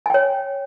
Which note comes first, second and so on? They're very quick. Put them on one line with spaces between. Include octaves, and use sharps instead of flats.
G#5 G5 C#5